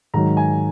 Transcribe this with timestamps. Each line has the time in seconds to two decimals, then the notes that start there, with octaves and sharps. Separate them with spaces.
0.14 G#2 D#3 F#3 A#5
0.37 G#5